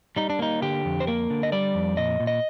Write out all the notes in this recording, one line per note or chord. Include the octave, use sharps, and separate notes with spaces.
G3 D#4
D4
A#3 D#4
D3 G4
F2
C5
A#3 A#4
D3
D#5
G3 D5
F2
A#2 D#5
A#2
D#5